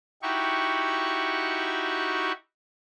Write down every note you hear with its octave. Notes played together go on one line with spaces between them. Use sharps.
D#4 E4 F#4 G4 C#6